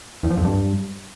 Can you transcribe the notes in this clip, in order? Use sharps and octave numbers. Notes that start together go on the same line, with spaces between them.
E2
F3
F2
G2